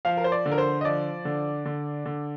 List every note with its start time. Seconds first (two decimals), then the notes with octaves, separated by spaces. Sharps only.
0.05 F3 F5
0.17 A#4
0.24 C5
0.32 D5
0.46 D3
0.52 A#4
0.58 C5
0.81 D#5
0.85 F3 D5
1.25 D3
1.65 D3
2.05 D3